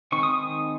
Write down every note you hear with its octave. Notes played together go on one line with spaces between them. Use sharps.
D#3 G#3 C4 D#4 C#6
D#6
D#6